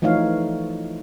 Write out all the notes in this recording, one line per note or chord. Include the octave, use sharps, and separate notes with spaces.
E3 F3 A3 D#4 C#5 F5